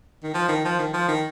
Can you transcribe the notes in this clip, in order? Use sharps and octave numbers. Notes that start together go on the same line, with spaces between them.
D#3
F3
D#3
F3
D#3
F3
D#3